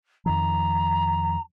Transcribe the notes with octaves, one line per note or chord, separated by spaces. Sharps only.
F2 D#3 F3 A#5